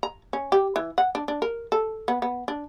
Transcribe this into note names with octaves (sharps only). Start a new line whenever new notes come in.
A#5
C#4
G4
E3
F#5
D4
D4
A#4
A4
B3
B3
D4